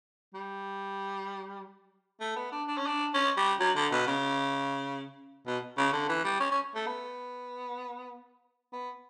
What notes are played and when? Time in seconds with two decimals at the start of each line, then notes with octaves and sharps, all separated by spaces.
0.34 G3
2.21 A3
2.36 B3
2.52 D4
2.67 D4
2.77 C#4
2.87 D4
3.14 C#4
3.37 G3
3.60 F#3
3.76 D3
3.91 B2
4.07 C#3
5.47 B2
5.78 C#3
5.93 D3
6.09 E3
6.24 G3
6.40 C#4
6.51 C#4
6.75 A3
6.87 B3
8.73 B3